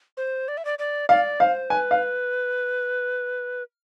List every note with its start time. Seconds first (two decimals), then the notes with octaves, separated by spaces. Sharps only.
0.17 C5
0.48 D5
0.57 E5
0.65 D5
0.79 D5
1.09 D5 F5
1.40 C5 F5
1.70 B4 G#5
1.91 F5